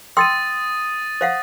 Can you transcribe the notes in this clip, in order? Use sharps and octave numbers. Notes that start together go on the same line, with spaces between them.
G5 C6 D#6 E6 A6 D#7
C5 F5 F#5